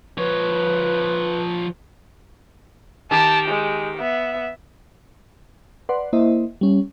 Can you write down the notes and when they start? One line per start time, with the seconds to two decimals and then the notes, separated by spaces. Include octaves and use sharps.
0.18 F3 B4 C#5
3.11 D#3 G4 A5
3.48 G#3
3.98 B3 E5
5.89 B4 D5 F#5 C6
6.13 A#3 E4 C5 D#5 E5
6.61 G3 C#4